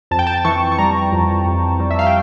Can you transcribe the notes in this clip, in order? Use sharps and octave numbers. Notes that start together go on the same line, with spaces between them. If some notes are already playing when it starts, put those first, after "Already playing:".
F2 A5
G5
A5
E3 C#6
C#6
G3 A#5
F2
F2
G3
E5
F5
G5